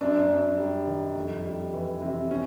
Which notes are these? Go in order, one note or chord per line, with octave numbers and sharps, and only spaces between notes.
F#2 D4
F#2
G3
D#3
F2
G3
E3
C3
C#4